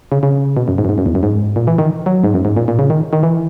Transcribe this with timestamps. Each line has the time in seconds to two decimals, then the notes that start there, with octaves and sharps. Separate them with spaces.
0.12 C#3
0.23 C#3
0.57 B2
0.68 F#2
0.78 G#2
0.85 F#2
0.89 G#2
0.98 F#2
1.06 E2
1.15 F#2
1.23 G#2
1.56 A#2
1.67 E3
1.78 D#3
2.06 F#3
2.24 G#2
2.34 F#2
2.45 G#2
2.57 A#2
2.68 A#2
2.79 C#3
2.90 D#3
3.13 D#3
3.23 E3